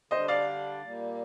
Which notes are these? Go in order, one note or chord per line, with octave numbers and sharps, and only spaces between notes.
D3 G3 D4 C5 D#5
D5 F5
A#2 G3 A#3